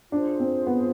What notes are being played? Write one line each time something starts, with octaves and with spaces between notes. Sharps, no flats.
D4 F4 G#4 C5
C4
B3